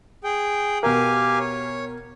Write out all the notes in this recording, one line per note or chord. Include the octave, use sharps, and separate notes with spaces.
G#4 G5
B2 G4 A#4 F5 G#5
C#5